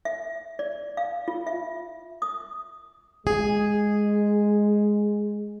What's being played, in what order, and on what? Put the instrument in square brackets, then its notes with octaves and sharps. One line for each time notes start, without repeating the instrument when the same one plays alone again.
[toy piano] E5
D5
F5
F4
E5
D#6
[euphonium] G#3 [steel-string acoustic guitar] G#4